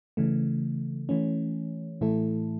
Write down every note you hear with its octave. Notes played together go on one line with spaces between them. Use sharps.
C#3 E3 A3
E3 A3 C#4
A2 E3 A3 E4 A4